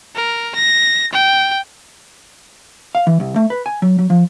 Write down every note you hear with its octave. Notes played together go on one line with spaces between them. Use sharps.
A#4
A#6
G5
F5
E3
C2
A3
B4
G#5
F#3
F#3
F3